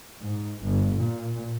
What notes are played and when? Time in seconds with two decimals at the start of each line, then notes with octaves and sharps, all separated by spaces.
0.23 G#2
0.63 G1
0.97 A#2